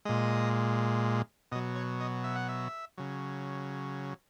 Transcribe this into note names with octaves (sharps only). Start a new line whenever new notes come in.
A#2 G#3 D#5
B2 F#3 D#5
C#5
D#5
E5
F#5
E5
C#3 F#3